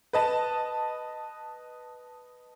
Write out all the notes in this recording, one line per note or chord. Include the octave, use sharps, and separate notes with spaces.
B4 D#5 A5